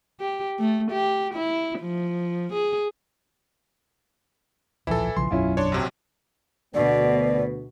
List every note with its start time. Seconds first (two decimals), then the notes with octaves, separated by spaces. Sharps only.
0.20 G4
0.59 A3
0.92 G4
1.35 E4
1.80 F3
2.54 G#4
4.87 D1 A#1 E3 F3 E4 A4
5.17 B1 C#3 F3 C6
5.31 E1 B1 F#2 C#4 E4 F4
5.57 D4 C#5 C6
5.72 A#1 C3 F#3
6.75 D2 B2 B3 D5